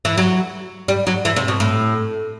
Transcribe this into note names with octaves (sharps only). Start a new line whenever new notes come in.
E3
F#3
G3
F#3
E3
C3
B2
A2